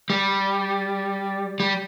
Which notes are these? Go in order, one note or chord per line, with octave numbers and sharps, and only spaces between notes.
G3
G3